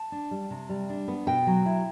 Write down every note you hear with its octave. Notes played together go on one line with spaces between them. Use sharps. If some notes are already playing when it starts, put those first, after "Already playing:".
Already playing: A5
D4
G3
C3
G3
D4
B3
B2 G5
F#3
E4